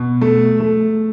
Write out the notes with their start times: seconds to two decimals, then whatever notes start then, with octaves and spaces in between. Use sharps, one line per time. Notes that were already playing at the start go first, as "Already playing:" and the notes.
Already playing: B2
0.21 A3
0.60 A3